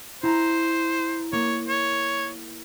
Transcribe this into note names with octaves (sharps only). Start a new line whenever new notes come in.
E4 C5 A#5
A#3 C#5
C#5